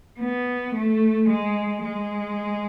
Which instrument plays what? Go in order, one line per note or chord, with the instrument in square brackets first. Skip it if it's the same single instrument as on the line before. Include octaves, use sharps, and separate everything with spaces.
[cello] B3
A3
G#3
G#3